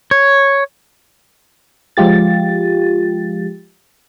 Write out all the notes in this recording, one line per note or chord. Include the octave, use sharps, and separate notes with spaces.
C#5
F3 G#3 F4 G4 A6